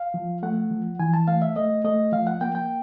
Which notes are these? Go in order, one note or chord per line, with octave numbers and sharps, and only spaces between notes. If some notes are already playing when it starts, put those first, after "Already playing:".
Already playing: F5
F3
A3 F#5
F3
E3 G#5
A5
A3 F5
E5
A3 D#5
A3 D#5
F3 F5
F#5
A#3 G5
G5